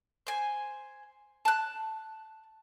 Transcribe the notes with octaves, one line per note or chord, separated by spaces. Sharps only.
C5 G#5
A5 F#6